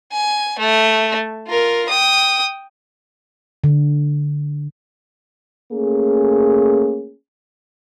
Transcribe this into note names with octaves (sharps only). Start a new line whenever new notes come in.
G#5
A3
F4 A#4
G5 D#6
D3
A3 A#3 C#4 G#4